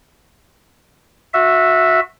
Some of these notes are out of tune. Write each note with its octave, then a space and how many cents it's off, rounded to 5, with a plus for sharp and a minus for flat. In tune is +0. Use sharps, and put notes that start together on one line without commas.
F#4 -20 E5 +0